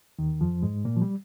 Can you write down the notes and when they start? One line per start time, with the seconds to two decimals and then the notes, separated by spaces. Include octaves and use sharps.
0.19 D#2 D#3
0.41 F2 F3
0.63 G#2 G#3
0.85 A#2 A#3
0.97 F3
1.02 G3